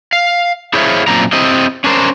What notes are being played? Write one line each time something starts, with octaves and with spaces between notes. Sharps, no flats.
F5
E4 G#4 C5 C#5 E5 F5
F#2 A#2 C4 D4 A#5
C4 E4 G4 D#5
C#4 D4 A#4 C5